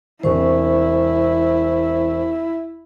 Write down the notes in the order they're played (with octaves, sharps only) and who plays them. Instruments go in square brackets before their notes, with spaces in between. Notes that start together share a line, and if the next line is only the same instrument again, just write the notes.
[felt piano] E1 C3 [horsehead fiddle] E4 [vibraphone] C5 C#6